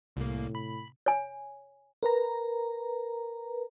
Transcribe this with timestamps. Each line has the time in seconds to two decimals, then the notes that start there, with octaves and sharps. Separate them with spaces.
0.17 C2 A2 C3 A#3
0.55 B5
1.06 C#5 G#5
2.03 A#4 B4 A#5